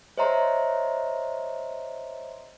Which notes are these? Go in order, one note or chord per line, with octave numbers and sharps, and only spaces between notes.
C5 C#5 D#5 E5 A#5 C6